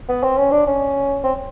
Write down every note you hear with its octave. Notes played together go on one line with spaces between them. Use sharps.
B3
C4
C#4
D4
C#4
C4